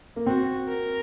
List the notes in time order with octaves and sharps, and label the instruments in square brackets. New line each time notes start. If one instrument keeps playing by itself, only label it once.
[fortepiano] A#3
[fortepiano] C4 [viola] F#4
[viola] A#4